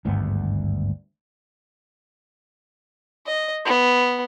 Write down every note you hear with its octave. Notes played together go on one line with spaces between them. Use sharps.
G#1 D2 G2 B3
D#5
B3